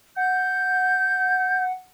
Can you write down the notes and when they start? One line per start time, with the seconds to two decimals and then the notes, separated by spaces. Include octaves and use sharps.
0.16 F#5 G6